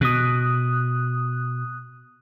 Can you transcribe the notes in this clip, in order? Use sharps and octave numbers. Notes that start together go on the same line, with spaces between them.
B2 D#6 F#6